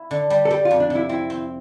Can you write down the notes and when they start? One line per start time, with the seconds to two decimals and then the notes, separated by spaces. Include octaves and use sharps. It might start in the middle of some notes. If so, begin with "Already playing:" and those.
Already playing: E4
0.11 D3
0.30 G3
0.45 A4
0.51 G3 G4
0.65 F4
0.71 F2
0.80 D4
0.90 C3
0.95 E4
1.09 C4 E4
1.30 C4